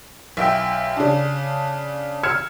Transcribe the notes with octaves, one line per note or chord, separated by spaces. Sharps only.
B1 E5 G5 E6
C#3 D4
E6 F6 G#6 C#7 E7